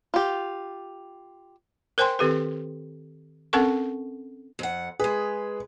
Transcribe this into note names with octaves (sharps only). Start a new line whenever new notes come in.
F4 G4
A#4 C5 G5 G#5 C6
D#3 C4 G4 A4 B4
C4 C#4 A4 A#4 F#5 C#6
F2 F#5
G#3 G#4 B4